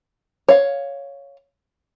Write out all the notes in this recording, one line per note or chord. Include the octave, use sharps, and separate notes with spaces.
C#5 F5